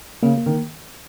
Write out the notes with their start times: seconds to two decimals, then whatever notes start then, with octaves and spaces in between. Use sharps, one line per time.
0.23 C#3 A#3
0.38 A#3
0.46 D#3